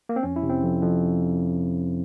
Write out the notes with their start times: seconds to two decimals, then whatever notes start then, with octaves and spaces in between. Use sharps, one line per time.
0.09 A#3
0.16 C4
0.23 F2 C#4
0.36 E4
0.43 C3
0.49 C4
0.62 F2
0.82 F2